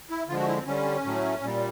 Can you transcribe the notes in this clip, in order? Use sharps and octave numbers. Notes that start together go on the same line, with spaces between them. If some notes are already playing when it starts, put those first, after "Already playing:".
E4
D3 F3 G#3 F4
F#4
E4
C4
D3 G3 C#4
A2 F#3 A3
A#2 G3